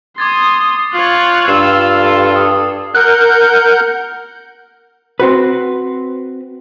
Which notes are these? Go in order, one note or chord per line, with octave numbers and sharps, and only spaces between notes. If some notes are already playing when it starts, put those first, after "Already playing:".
C6 D6 D#6 G#6 A6
F4 C#5 F#6 C7
G2 F4 E6 C7 E7 F#7
A4
D#6
A#4 F#5 F#6 G6
C4 F#4 B4